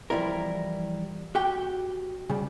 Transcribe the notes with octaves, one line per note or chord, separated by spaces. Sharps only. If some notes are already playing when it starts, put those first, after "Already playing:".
E3 F3 G3 E4 A#4
F#4 G4 G5
C#3 G3